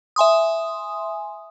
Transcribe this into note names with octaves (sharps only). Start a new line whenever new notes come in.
E5 G#5 C6 D#6